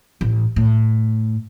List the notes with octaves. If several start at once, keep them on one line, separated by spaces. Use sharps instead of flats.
A1
A2